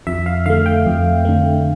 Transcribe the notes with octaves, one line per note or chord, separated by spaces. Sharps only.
F2 E5
F5
D3 A3 F5
G5
F2
D3 A3